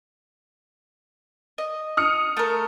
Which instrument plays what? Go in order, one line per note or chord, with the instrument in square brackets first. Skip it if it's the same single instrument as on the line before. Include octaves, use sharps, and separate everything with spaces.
[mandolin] D#5
[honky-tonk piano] D#6 F6 C#7
[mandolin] A3 A#4